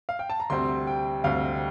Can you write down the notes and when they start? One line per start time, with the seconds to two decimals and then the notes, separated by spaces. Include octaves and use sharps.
0.09 F5
0.19 G5
0.30 A5
0.40 A#5
0.50 D2 C3 G3 C4 C6
0.87 G5
1.24 D2 C3 G3 C4 F5